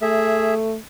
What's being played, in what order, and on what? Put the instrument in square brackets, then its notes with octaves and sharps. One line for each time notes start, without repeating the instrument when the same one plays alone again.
[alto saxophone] A3 [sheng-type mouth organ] G#4 E5